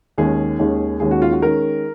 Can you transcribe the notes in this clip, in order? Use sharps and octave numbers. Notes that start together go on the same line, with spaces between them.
D#2 D#3 G#3 C#4 G#4
D#2 D#3 G#3 C#4
D#2 D#3 G#3 C#4 G#4
F#4
F4
F#4
D#3 G#3 C#4 A#4